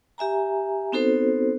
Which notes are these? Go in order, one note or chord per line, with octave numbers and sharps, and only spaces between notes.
G4 E5 G#5 A#5
B3 C4 D#4 F#4 A4 C5